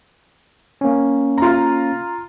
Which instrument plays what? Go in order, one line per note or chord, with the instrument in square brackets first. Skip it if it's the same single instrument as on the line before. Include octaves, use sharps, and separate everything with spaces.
[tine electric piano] A#3 C#4
[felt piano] F4 A#5